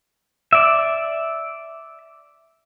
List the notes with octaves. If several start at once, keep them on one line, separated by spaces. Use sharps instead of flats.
D5 E5